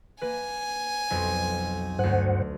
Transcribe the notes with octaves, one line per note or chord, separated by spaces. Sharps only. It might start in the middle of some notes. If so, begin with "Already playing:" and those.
A#3 B4 G#5
B1 F2 B3
D2 G2 C5 F#5 F#6